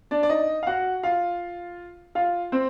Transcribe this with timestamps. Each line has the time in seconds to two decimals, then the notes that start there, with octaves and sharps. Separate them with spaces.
0.11 D4 D5
0.23 D5
0.30 D#4 D#5
0.63 F5
0.67 F#4 F#5
1.03 F4 F5
2.15 F4 F5
2.52 C4 C5